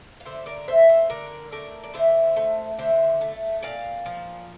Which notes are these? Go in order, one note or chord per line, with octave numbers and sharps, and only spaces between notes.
F5
D3 C5 E5
A#4 D5
A3 C5 E5
C5 E5
D3 A#4 D5
A3 A#4 D5
D5
D3 C5 E5
A3
D3 C5 E5
A3
A#2 D5 F5
F3